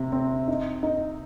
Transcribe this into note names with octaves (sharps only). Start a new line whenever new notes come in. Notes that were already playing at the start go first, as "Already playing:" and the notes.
Already playing: C3 C4
C4
D#4
D#4